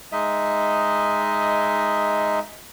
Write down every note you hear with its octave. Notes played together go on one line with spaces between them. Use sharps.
G#3 D#4 D#5 E5